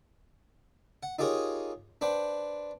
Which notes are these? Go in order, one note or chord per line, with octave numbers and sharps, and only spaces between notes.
F#5
D#4 F4 G4 G#4 A#4 C#5
D4 B4 C5 G5